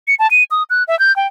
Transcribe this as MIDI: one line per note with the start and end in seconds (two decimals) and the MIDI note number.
0.08 0.15 97
0.19 0.30 81
0.31 0.44 99
0.51 0.63 87
0.70 0.83 90
0.88 0.98 76
0.99 1.14 91
1.16 1.27 79